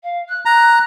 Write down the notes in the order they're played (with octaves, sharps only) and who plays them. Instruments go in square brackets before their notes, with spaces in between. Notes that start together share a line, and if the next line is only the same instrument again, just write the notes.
[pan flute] F5
F#6
[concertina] A#5 [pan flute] F#6